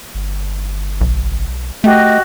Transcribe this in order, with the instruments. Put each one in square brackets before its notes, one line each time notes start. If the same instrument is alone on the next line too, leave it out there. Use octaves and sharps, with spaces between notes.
[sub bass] G1
[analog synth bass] B1
[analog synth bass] A3 [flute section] F#4 G4 D#5